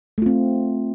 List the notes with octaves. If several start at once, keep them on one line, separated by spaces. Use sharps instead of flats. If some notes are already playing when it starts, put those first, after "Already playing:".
A3 C4 F4